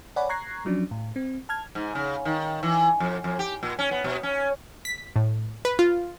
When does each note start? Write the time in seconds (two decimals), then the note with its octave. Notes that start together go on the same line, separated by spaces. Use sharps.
0.16 C#5 D5 F#5 G#5 B5
0.29 A#5 C#6 F#6 G#6 A#6 C7
0.65 F3 F#3 C#4 D4
0.91 A2
1.16 C4
1.49 A5 F6 G#6
1.75 G#2
1.95 C#3
2.25 D#3
2.63 E3
3.00 F2
3.24 F2
3.39 G4
3.63 A#2
3.79 C#4
3.91 B3
4.04 B2
4.23 C#4
4.85 B6
5.16 A2
5.65 B4
5.79 F4